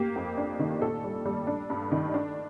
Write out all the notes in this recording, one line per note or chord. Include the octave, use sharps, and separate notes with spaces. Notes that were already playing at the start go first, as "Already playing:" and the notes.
Already playing: A#3 G4
F2
D4
D#3
A#2 A4
G3
G3
D4
G2
D#3
D4